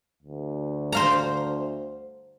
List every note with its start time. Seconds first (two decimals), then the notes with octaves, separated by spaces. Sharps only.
0.23 D2
0.92 C5 F5 A#5